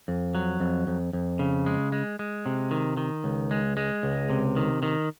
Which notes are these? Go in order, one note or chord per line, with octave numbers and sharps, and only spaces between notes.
F2
F#3
F2
F2
F2
C#3
G#3
G#3
G#3
C3
D#3
D#3
C#2
G#3
G#3
C#2
C3
D#3
D#3